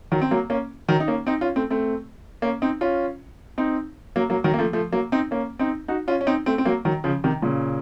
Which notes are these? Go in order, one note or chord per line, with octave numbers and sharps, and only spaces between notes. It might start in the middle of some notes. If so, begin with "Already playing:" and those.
D#3 F#3
C4
F#3 A#3
A#3 C#4
D#3 F#3
D#4
A#3 C#4
C4 D#4
C#4 F4
A3 C4
A3 C4
A#3 C#4
C4 D#4
C#4 F4
C4 D#4
F#3 A#3
F#3 A#3
D#3 F#3
A#3
F3 A3
F3 A3
F#3 A#3
C4 D#4
A#3 C#4
C4 D#4
D#4 F#4
C#4 F4
C#4
C4 D#4
A3 C4
C4
F#3 A#3
D#3 F#3
C#3 F3
C3 D#3
A#2 C#3